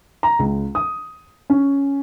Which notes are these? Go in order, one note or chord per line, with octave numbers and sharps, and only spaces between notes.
A#5
C#2
D#6
C#4